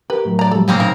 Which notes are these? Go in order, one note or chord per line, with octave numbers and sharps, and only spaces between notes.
G4 A#4 B4
A2 F#3
D5 A#5
F3 G3 A4
C#3 A#3 C4
A#2 D#4 A#4